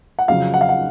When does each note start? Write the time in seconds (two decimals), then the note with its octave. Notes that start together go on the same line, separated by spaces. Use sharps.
0.19 F#5
0.28 F2 C#3 F#3 F5
0.54 F#5
0.61 F5
0.69 F#5